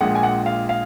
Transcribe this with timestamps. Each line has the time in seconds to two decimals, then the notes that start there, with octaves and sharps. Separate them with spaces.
0.01 A#1 A#2 G#3 F#5
0.15 G#5
0.23 F#5
0.46 F5
0.69 F5